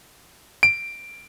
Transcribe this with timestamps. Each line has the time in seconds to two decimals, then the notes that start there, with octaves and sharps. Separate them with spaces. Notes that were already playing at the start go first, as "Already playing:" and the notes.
0.63 D7